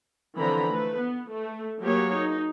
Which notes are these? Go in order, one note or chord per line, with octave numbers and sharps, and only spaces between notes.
D3 E3 F3 C4 A#5 B5
A3 B4
B3
A3
F#3 A#3 G4 G#4 C#5
D#4